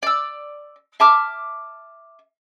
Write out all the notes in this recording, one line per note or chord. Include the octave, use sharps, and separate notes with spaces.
D5 E6
E5 A5 D6 F6